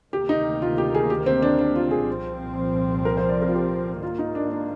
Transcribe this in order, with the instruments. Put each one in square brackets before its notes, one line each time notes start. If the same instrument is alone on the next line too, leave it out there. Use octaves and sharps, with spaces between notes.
[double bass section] D2 C3 D#3 A#3 [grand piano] G4
[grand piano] D#4
F4
G4
G#4
G4
C4
D4
D4
F4
G#4
[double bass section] C2 A#2 F3 C4
[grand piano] A#4
C5
D5
A#4
F4
G4
[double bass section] G#2 D#3 A#3 [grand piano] F4
[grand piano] D#4
D4
D4